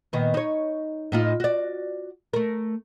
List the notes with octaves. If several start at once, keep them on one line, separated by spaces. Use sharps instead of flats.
A#2 D#3 B3
D#4 C#5
A2 D#4 F4
F#4 D5
A3 A#4